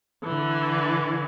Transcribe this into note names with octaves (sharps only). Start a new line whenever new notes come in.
D3 E3